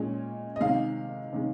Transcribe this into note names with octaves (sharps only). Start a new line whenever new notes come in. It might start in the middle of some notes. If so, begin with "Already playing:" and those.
Already playing: A#2 G#3 C#4
D#5
C3 D#3 G#3 F5
C3 D#3 G#3